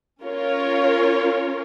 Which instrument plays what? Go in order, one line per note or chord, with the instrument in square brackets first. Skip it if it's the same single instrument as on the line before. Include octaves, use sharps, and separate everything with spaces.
[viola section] C#4 F4 A#4 C#5